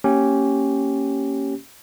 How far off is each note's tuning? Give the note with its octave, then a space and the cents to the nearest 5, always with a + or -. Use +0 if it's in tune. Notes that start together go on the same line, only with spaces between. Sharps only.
A#3 -15 C#4 -5 G4 -15